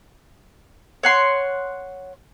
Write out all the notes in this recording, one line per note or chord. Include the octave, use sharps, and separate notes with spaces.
C#5 F#5 C6